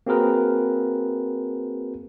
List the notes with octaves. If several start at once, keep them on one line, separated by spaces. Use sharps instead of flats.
A#3 C4 F#4 G#4 A#4 B4